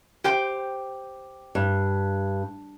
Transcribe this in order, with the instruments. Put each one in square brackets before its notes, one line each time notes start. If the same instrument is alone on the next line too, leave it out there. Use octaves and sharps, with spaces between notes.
[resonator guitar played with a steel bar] G4 C5 G5
[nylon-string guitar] G2